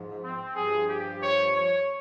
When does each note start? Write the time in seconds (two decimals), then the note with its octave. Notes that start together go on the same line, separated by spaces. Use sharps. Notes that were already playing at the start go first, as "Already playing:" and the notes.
Already playing: G#2 F3
0.20 C4
0.53 G2 F3 G#4
0.86 G4
1.20 C#5
1.53 C#5